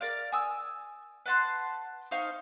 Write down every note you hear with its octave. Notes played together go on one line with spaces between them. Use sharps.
A#4 D5 F5
G#5 D#6 E6
B4 F#5 A5 C6
D#4 C5 F5 C#6